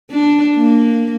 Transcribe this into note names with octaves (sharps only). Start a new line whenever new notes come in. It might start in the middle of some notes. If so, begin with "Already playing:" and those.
D4
A#3